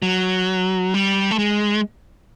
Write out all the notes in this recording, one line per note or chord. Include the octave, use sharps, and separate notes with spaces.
F#3
G3
A3
G#3